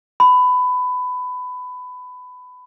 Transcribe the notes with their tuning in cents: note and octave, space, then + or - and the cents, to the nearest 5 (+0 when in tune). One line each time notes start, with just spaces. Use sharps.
B5 +20